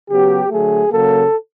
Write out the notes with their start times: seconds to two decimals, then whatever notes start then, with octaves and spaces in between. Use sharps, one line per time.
0.08 C#3 F#3 B3 G4
0.50 D3 F#3 A3 G#4
0.91 C#3 F#3 A#3 A4